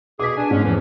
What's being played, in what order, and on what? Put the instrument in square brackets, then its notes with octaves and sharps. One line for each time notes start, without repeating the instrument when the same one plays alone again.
[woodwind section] B2 G#4 [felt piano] D6 B6
[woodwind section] D4 G#5
[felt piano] G#2 B2 [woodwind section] C#4
[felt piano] E2 [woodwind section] E3 F3